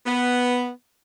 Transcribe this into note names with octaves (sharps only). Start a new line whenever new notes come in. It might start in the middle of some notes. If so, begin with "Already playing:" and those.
B3